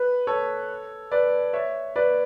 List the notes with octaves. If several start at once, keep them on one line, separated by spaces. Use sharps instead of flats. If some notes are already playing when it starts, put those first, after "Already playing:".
Already playing: B4
A4 C#5
B4 D5
C#5 E5
B4 D5